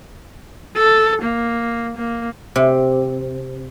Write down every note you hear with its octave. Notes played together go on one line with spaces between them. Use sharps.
A4
A#3
A#3
C3